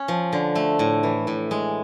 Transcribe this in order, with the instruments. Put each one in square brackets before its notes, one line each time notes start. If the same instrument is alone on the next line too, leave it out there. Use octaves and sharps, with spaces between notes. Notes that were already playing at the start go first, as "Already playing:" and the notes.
Already playing: [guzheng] C#4
F3
D3
A3
A2
E3
A2
G#3